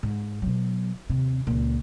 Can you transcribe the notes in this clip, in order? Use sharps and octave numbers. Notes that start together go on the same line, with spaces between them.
G#2
B2 F#3
D#2 C3
C#2 A#2